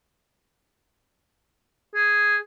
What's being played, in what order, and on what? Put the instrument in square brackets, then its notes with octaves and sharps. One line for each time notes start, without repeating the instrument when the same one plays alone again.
[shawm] G#4